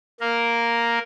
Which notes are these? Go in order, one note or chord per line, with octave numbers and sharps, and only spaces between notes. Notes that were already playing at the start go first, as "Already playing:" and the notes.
A#3 A#4